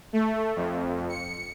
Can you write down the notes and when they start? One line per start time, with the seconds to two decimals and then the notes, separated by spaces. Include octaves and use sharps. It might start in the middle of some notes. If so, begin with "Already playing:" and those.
0.13 A3
0.56 F2
1.09 C#7